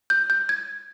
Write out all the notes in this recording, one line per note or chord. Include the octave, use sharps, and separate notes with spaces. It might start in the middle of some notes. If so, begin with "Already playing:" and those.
G6
G6
G#6